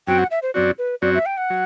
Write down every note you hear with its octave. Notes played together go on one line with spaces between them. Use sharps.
F#2 F#3 C4 F#4 G5
F#5
E5
C5
F#2 F#3 C4 F#4 D5
B4
F#2 F#3 C4 F#4 D5
E5
G5
F#5
F#3